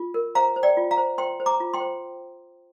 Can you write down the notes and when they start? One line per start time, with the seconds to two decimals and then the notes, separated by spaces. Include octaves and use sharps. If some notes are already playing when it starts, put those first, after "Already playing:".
Already playing: F4
0.14 A#4
0.35 C5 F5 A#5
0.56 C5
0.63 D5 G5
0.77 F4
0.91 F5 A#5
0.97 C5
1.18 C5 G5 C6
1.40 C5
1.46 A#5 D6
1.60 F4
1.74 G5 C6
1.80 C5